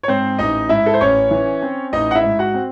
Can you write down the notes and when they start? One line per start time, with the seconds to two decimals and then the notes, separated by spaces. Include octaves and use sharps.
0.03 C#5
0.08 G#2 C4 C5
0.39 A1 D#4 D#5
0.69 G#2 E4 E5
0.86 A4
0.94 C5
1.01 A1 C#4 C#5
1.31 E3
1.62 C4
1.93 A1 D#4 D#5
2.11 F#5
2.15 E4 E5
2.23 G#2
2.39 F#4 F#5
2.54 C4